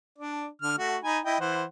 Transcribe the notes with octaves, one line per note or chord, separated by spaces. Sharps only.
D4 D5
D3 F6
A3 F#4
D#4 G#5 B5
E4 D#5 G5
E3 C5 F#5